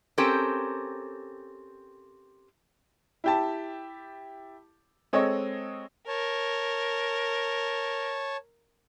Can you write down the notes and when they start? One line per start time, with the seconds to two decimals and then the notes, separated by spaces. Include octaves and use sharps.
0.18 C4 C#4 G4 A4 A#4
3.24 E4 G4 A5
5.13 G#3 C4 A4 C#5 D#5
6.08 A#4 C#5 A5